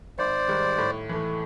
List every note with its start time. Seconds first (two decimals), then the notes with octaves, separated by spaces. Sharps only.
0.19 G#1 C5 D5
0.48 G#2 D#3 G3
0.78 A2
1.09 E3 A3